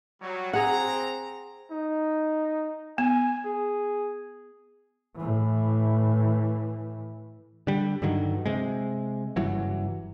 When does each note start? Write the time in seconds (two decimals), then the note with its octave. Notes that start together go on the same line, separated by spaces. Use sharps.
0.22 F#3 G3 F#4
0.53 C4 G#4 F#5 A#5
1.71 D#4
2.98 B3 G#5
3.45 G#4
5.16 A2 E3
7.67 D3 G3
8.02 G2 D3 D#3 F#3
8.46 C3 G#3
9.36 F#1 G2 E3 F#3